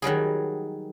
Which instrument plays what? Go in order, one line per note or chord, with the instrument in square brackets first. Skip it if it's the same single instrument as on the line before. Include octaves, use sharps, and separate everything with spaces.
[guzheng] D#3 F#3 G3 G#4